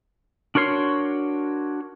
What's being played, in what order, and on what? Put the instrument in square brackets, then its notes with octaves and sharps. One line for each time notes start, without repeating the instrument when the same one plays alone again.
[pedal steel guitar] D4 F#4 A#4 C#5 C6